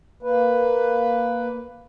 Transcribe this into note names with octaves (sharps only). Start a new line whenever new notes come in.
A#3 B4